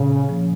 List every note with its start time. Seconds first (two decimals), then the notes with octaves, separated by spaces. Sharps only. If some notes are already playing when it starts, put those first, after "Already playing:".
Already playing: A#2 C#3
0.29 F3 A#3